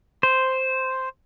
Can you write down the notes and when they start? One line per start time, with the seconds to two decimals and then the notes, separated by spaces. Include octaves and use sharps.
0.23 C5